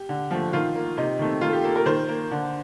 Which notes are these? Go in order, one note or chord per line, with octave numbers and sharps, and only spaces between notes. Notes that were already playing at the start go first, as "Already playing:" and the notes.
Already playing: G4
D3
F3 A3
D#3 F4
A#3
C3 D#4
D#3 A3 C4
D#3 F4
A4
G4
A#3 A4
A#4
D#3 C5
A#3
D3